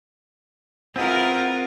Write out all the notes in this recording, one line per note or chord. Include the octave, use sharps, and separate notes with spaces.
C4 E4 F4 G#4 A#4 B4 F#5